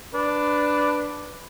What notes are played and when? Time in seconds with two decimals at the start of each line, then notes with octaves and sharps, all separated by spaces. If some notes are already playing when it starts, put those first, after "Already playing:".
0.14 D4 B4